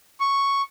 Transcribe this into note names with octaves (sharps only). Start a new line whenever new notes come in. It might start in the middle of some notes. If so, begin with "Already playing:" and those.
C#6